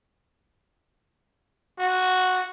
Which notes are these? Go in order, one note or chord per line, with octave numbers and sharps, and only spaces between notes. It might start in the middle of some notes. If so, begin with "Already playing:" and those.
F#4